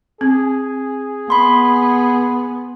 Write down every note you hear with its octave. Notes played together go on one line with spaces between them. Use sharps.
C4 G#4
B3 B5 C6